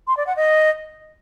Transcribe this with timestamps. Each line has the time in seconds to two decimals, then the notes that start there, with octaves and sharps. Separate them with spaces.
0.07 C6
0.17 D5
0.27 F#5
0.36 D#5